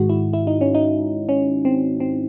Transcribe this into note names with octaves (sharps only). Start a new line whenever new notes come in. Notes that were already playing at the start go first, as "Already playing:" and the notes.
Already playing: G#2 D#3 G#3 F#4
E4
E4
D#4
C#4
D#4
C#4
C4
C4